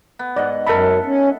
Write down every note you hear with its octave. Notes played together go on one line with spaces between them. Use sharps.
B3
G#2 D5 D#5 F#5
F#2 A4 A#4 E5 B5
C#4